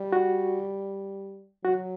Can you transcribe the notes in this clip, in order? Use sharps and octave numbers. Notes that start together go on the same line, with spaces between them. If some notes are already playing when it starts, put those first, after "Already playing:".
Already playing: G3
F#4
F#3 F#4